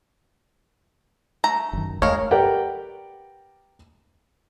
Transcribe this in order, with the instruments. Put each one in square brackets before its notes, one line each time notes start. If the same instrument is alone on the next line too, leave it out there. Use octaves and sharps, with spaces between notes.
[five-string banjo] A3 A#5
[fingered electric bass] F#1 D#3
[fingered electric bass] G1 D#2 A3 [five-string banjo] G#3 A#4 [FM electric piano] C#5 F5
[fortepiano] G4 A#4 B4 D5 F#5 G5